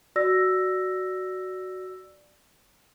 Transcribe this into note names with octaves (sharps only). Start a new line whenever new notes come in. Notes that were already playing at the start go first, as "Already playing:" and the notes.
F#4 D5 E6 A#6